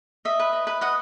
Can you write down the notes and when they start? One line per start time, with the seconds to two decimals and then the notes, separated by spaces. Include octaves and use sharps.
0.25 D#5 E5
0.39 B4
0.53 D#5
0.67 B4
0.81 D#5 F#5